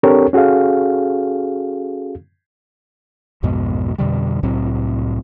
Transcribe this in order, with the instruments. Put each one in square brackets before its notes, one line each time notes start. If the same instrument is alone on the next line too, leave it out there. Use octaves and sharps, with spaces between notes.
[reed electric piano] C4 D4 G4 A4 A#4 C#5
C#4 F#4 G#4 A4 F5
[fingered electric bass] B1 F2 G#2 B2
F2 B2 D3 G3
C2 A2 F#3 C4